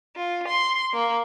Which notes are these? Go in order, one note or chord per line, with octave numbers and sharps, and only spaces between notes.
F4
C6
A#3